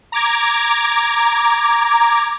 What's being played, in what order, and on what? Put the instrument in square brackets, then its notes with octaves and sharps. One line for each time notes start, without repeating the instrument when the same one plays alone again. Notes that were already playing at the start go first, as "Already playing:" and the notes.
[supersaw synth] A#5 D6 G#6